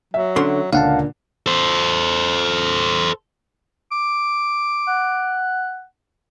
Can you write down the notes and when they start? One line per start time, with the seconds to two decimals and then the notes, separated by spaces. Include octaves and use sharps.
0.14 F#3 E5
0.36 D3 C#4 C6
0.73 C#2 A#2 D3 F5 F#5 A5
1.46 A4 C5
3.92 D6
4.88 F#5